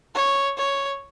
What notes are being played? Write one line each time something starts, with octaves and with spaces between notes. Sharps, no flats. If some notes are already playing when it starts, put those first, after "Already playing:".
C#5
C#5